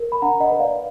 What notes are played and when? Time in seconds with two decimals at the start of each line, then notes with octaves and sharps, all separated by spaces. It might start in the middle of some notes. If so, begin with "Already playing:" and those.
Already playing: A#4
0.12 B5
0.22 D4 F#5 A#5
0.40 D#5 F#5
0.51 B4
0.59 D5 F5